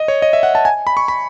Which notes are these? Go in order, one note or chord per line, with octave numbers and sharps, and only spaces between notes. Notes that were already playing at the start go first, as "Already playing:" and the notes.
Already playing: D#5
C#5
D#5
E5
F#5
A5
G#5
B5
C#6
B5